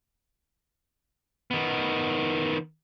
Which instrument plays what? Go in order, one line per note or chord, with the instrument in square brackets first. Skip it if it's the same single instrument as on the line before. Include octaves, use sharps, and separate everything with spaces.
[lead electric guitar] D#3 B3